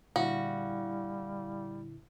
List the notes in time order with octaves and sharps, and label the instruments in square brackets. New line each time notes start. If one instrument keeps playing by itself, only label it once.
[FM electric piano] A#2 D3 E4 [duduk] G3 [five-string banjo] F#4 [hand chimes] F5